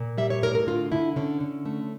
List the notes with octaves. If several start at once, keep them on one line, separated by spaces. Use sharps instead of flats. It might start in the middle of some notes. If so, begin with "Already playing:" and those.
Already playing: A#2
G3 E5
C#5
A2 A#4
A#4
D3 F4
D3 E4
D3 C#4
D3
A3